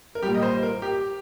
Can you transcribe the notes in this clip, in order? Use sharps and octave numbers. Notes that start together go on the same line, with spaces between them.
A#4
A#2 G3 G4
D#5
C5
A#4
G4